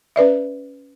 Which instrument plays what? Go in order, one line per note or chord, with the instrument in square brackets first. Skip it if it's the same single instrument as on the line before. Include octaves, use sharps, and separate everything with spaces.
[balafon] C#4 B4 D5 E5